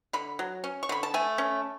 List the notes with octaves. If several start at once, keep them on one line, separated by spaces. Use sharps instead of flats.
D3 B5
F#3
C#4
C#6
D3 B5
A5
A3 G#5
C#4